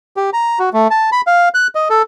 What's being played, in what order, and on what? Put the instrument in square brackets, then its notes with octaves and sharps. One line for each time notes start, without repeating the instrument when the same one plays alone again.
[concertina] G4
A#5
F#4
A3
A5
B5
F5
F#6
D#5
A4